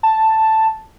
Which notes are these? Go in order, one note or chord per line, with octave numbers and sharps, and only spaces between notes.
A5